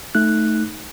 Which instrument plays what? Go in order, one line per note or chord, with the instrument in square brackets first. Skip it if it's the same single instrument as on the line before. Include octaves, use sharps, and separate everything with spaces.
[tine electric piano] A3 D#4 F#6